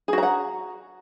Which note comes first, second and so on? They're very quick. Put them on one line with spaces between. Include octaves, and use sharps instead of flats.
G#4 F#4 A#5 F#5